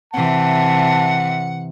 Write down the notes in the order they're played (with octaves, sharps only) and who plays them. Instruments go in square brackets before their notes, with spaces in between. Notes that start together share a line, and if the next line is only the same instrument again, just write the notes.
[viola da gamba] C3 E3 [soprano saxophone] F#5 [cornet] A5